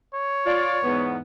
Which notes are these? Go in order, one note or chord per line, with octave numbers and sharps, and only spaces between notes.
C#5
F4 D5
E2 G#2 B3